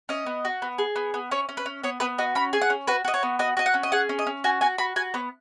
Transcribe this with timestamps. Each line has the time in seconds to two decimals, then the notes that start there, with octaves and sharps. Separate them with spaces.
0.09 C#4 D#5
0.26 B3
0.45 F#4
0.62 B3
0.78 G#4
0.96 B3
1.14 B3
1.31 C#4 C#5
1.49 C#4
1.57 B4
1.66 C#4
1.83 B3 C#5
2.00 B3 B4
2.18 F#4 D#5
2.35 C#4 B5
2.53 G#4 G#5
2.62 F#5
2.70 C#4
2.87 F#4 B4
3.05 F#4 D#5
3.14 C#5
3.23 B3
3.39 F#4 D#5
3.57 F#4 D#5
3.66 F#5
3.74 C#4
3.83 D#5
3.92 G#4 F#5
4.09 C#4
4.19 D#5
4.27 C#4
4.44 F#4 G#5
4.61 F#4 G#5
4.78 F#4 B5
4.96 F#4 G#5
5.14 B3 C#5